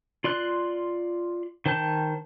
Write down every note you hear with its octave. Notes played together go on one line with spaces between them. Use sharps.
F4 D5 C6 F#6
D#3 C5 G5 A5 G6